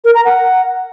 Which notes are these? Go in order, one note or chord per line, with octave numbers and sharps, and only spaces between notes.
A#4
A#5
F#5